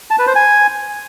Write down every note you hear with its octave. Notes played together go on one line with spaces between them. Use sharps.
A5
B4
C5
G#5